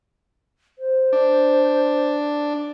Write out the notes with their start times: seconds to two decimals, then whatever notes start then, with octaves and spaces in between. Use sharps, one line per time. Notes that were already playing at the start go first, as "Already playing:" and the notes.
0.79 C5
1.13 D4